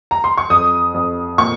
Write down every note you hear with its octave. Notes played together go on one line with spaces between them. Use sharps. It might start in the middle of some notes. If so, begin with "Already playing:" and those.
A#5
C6
C#6
F2 D#6
F2
A#2 C#6